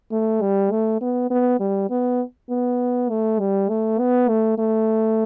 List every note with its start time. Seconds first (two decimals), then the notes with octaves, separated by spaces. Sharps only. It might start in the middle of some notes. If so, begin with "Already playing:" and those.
0.11 A3
0.41 G3
0.71 A3
1.01 B3
1.30 B3
1.60 G3
1.90 B3
2.49 B3
3.09 A3
3.39 G3
3.69 A3
3.99 B3
4.28 A3
4.58 A3